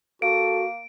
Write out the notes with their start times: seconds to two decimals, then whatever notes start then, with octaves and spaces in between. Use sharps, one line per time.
0.22 A#3 F#4 A4 D7